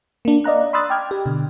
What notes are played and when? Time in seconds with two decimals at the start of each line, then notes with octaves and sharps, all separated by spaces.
0.25 A#3 D4
0.44 D5 D#5 F5 A#5 F#6
0.73 B5 C6 D#6 E6 F#6 A6
0.90 G5 D6 F6 G#6
1.11 G4
1.26 B2 D3